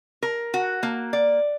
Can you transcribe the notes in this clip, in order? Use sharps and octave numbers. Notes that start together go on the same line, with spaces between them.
A#4
F#4
A#3
D5